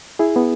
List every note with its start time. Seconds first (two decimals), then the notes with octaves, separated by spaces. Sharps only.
0.19 E4 G#4
0.36 B3